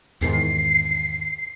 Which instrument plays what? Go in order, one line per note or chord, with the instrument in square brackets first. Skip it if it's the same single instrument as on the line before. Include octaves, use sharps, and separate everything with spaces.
[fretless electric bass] E2 G#2 D#3 [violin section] C7